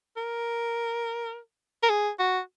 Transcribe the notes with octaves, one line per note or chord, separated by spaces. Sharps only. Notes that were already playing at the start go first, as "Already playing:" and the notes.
A#4
A#4
G#4
F#4